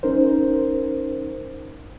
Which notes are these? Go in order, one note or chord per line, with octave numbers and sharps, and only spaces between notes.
C#4 D#4 A#4 C5